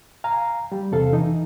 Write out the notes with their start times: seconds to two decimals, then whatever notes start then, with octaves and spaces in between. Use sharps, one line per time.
0.24 F5 G#5 A#5
0.72 G3
0.91 E2 C3 A4 F5
1.13 E3 D#4